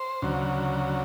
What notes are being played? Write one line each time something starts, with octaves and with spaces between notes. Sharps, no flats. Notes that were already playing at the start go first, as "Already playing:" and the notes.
Already playing: C5
D2 C#3 F#3